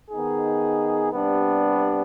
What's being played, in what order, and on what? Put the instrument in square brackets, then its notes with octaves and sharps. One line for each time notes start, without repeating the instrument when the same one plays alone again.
[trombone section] D#3 B3 D#4 G#4
C3 G3 B3 D4